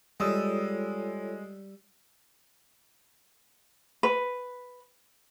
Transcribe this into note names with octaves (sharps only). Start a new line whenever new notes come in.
G3 G#3 F4 A4 C#5 D#6 E6
B4